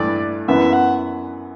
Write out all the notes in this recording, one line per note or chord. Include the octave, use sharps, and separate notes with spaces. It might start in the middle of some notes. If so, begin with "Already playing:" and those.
Already playing: G2 E3 A3 D5
F#2 E3 B3 E5
F#5